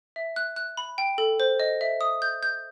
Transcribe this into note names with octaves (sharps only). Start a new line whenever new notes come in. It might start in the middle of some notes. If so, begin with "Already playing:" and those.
E5
F#6
F#6
B5
G5
A4
C5
D#5
E5
D#6
G6
G6